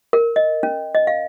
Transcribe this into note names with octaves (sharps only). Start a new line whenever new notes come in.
A#4
D#5
C#4
D#5
F5